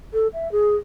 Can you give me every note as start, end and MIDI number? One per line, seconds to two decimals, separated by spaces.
0.13 0.27 69
0.33 0.50 76
0.52 0.75 68